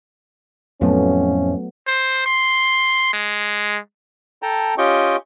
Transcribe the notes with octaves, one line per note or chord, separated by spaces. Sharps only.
F2 A2 F3 F#3 A3 B3 C#4
C5
C6
G#3
A4 G5 A5 A#5
C#4 F4 G4 D#5 G5 C#6